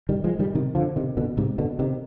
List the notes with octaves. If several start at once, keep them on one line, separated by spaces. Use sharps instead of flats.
D#3 G3
F3 G#3
D#3 G3
C3 D#3
D3 F3
C3 D#3
B2 D3
G#2 C3
B2 D3
C3 D#3